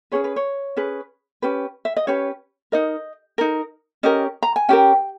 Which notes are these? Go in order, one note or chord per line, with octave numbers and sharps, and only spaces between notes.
C#4 G#4 B4 C#5
B4
C#5
C#4 G#4 B4
C#4 G4 B4
E5
D#5
C#4 G4 B4 C#5
D#4 A#4 D#5
D#4 A#4
C#4 G4 A#4 D#5
A#5
G#5
C#4 G4 A#4 G5